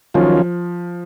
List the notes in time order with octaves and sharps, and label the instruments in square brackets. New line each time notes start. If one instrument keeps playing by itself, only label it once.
[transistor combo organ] D#3 F#3 C#4 F4 [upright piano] F3